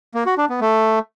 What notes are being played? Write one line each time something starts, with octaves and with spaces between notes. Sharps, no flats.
A#3
F#4
D4
B3
A3